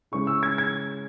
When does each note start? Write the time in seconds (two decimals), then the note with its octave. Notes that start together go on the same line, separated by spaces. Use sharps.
0.12 C#3 G#3 C#4 E4 C#6
0.27 E6
0.43 G#6
0.58 G#6